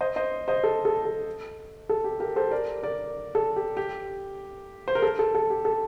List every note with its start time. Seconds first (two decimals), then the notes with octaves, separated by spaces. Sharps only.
0.01 C5 D#5
0.16 C5 D#5
0.48 C5 D#5
0.64 A4
0.85 A4
1.05 A4
1.89 A4
2.04 G4
2.20 G4 A#4
2.36 A4 C5
2.51 A#4 D5
2.83 A#4 D5
3.35 A4
3.56 G4
3.77 G4
4.88 C5
4.95 A#4
5.02 A4
5.19 A4
5.35 A4
5.50 G4
5.65 A4